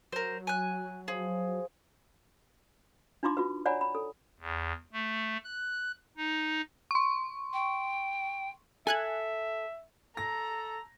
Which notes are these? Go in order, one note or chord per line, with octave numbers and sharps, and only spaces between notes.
F#3 A#4 C5
G#5 F#6
F3 G#4
D4 D#4 F4 A#5 C6 D6
F4 F#4 B4
C#5 D5 F#5 G#5 A#5 B5
B5
A4
E2
A3
F#6
D#4
C6 C#6
G5
A4 E5 G#5 F#6 G#6
A4 A#5 A#6